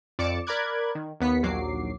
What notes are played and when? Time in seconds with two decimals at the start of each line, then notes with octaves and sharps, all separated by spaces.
0.19 F2 D5 D6 C#7 E7
0.47 A#4 D5 B5 D6 F#6 G#6
0.95 D#3
1.20 D#2 B3 B6 C#7
1.43 A#1 D#2 F#3 D6 C7